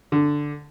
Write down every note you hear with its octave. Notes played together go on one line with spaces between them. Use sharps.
D3